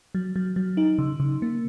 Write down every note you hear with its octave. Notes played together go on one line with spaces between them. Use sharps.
F#3
F#3
F#3
D#4
C#3
C#3
A#3